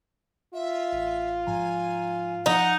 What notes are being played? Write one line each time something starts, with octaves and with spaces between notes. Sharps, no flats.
F4 E5
A1
G#2 F3 G#5 A#5
F3 D#4 F#5